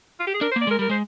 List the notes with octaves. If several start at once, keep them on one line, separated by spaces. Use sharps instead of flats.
F4
G4
G#4
D4 A#4
C5
A#3
D5
G#3 A#4
G3 A#4
G#3 C5